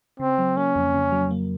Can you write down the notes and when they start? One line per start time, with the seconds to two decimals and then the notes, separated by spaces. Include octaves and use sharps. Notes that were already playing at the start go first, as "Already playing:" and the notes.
0.20 C#3 C4
0.38 F#3
0.57 A#3 C#4
0.76 F2
0.94 C#3
1.12 F#3
1.31 A#3